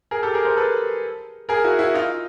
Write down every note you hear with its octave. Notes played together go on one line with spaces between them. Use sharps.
G#4 A#4
G4 A4
G#4 A#4
A#4 C5
A4 B4
G#4 A#4
E4 F#4
E4 F#4
D#4 F4